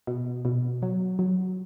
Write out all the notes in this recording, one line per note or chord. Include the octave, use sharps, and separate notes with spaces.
B2
B2
F#3
F#3